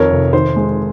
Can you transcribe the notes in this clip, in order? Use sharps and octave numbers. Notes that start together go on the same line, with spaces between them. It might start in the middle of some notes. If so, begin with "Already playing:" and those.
Already playing: F2 D#3 A#4 C#5
F1
D#3 C5
G#3